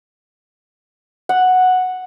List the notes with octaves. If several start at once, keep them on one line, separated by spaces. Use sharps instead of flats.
F#5